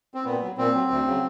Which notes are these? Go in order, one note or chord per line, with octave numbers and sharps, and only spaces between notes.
C4
A#2 B3
F#3
A#2 C4
F#3
D2
C#3 F#3